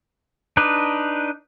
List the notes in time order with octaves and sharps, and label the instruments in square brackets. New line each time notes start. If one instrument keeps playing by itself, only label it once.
[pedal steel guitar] D4 D#4 B4